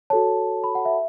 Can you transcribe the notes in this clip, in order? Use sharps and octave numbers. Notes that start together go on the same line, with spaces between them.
F#4 A4 C#5 A5
B5
F#5
E5